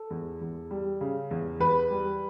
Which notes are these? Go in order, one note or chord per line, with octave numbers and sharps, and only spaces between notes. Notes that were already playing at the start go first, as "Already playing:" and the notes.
Already playing: A4
E2
E2
G3
C#3
E2
E2 B4
G3